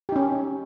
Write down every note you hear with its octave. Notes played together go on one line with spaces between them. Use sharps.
C#4 D#4 G4